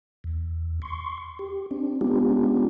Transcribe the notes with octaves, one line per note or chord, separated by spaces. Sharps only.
E2
C6 C#6
G4
C4 D4
G#3 B3 C#4 D4 F4 G4